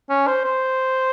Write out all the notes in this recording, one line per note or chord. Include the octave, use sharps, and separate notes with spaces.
C#4
C5
C5